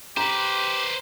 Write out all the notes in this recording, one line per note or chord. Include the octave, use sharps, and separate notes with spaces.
G4 B4 C5 A#5